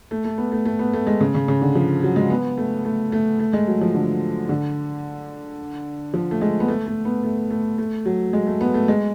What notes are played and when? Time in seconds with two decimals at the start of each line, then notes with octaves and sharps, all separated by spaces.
0.11 A3
0.25 A3
0.38 B3
0.52 A3
0.65 A3
0.79 B3
0.94 A3
1.07 G#3
1.21 C#3
1.35 C#3
1.48 C#3
1.62 D3
1.75 F3
2.03 F#3
2.16 G#3
2.30 B3
2.58 A3
2.85 A3
3.12 A3
3.40 A3
3.53 G#3
3.67 F#3
3.81 F3
3.95 D3
4.49 D3
6.14 F3
6.31 A3
6.41 G#3
6.60 B3
6.68 A3
6.87 A3
7.05 B3
7.24 A3
7.51 A3
7.78 A3
8.06 F#3
8.33 G#3
8.47 A3
8.61 B3
8.74 A3
8.88 G#3